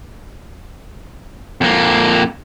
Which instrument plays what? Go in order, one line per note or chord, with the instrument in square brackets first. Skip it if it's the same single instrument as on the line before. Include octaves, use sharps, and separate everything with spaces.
[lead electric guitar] F2 A#3